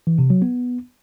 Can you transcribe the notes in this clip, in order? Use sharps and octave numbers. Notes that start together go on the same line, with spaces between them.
E3
C3
F#3
B3